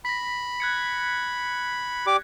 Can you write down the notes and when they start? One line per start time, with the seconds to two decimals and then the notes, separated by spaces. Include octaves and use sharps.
0.05 B5 A#6 B6
0.60 F#6 G#6 C#7
2.07 G4 D5 D6